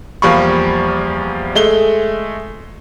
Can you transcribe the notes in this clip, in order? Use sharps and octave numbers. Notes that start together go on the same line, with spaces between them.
E2 F3 G3 A#3 B5 C#6
G#3 A3 G7